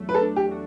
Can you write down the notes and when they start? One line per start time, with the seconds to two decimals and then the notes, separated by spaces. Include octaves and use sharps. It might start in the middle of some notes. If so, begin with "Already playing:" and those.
Already playing: E2 F#3 A3
0.09 B4
0.14 A4
0.22 D4
0.36 G4
0.51 F#4